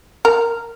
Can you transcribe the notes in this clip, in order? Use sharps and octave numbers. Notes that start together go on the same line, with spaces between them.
A#4